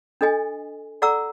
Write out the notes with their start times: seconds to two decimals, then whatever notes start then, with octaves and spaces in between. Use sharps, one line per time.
0.21 D4 A4 D#5 G#5
1.02 A4 D5 F#5 A#5 D6 E6